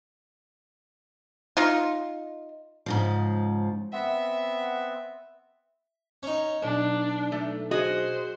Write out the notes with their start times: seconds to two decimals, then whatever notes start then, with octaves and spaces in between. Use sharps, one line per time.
1.57 D#4 F4
2.86 G#2 C#3 F3
3.93 B3 C4 E5 F#5
6.23 C#4 D#4
6.63 B1 D4
7.32 A3
7.71 F#4 G#4 C5 D#5